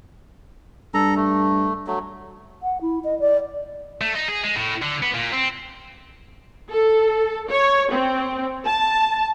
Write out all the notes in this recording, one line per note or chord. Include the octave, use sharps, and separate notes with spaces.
G2 A4 A#5
A3
F#3 A3
F#5
E4
D#5
D5
A3
D#4
G#4
G#3
A2
D3
B3
A#2
C4
A4
C#5
C4
A5